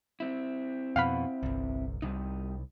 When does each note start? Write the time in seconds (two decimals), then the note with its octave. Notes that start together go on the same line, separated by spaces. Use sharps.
0.20 C4 E4
0.96 F2 B2 F5 F#5 B5
1.43 G1 C2
2.02 C2 C3 G3 D#4